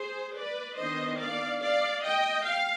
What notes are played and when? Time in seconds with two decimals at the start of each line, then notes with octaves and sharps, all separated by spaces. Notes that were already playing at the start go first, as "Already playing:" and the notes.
Already playing: G#4 C5
0.37 B4 D5
0.78 D#3 B3 D4 C5 D#5
1.20 D5 F5
1.63 D5 F5
2.04 D#5 G5
2.47 F5